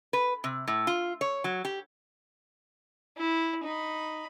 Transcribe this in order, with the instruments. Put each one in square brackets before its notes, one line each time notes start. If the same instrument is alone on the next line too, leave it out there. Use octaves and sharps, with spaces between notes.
[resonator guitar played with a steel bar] B4
C3
A2
F4
C#5
F#3
G4
[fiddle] E4
D#4 B5